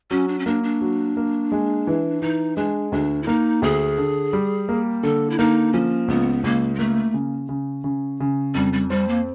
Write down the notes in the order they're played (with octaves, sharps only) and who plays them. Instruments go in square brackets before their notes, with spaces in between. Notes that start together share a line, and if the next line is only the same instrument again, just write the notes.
[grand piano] F#3 [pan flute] C#4
[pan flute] D4
C#4
[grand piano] A#3 [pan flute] D4
[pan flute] D4
[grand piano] F#3
A#3
G#3
E3
[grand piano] E3 [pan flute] D#4
[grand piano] G#3 [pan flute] D4
[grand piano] D2 [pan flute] D4
[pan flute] E4
[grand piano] A#3 [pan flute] D#4
[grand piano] D2 [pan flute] G#4
[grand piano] D3
G3
A#3
[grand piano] D3 [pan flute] A4
[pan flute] E4
[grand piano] A#3 [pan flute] D#4
[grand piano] F3 [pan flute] C#4
[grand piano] C#2 [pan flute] B3
[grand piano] C#2 [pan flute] A#3
[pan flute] G#3
[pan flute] A3 [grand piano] A#3
[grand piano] C#3
C#3
C#3
C#3
[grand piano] F2 [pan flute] G3
[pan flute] G3
[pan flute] G3 [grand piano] C4
[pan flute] A#3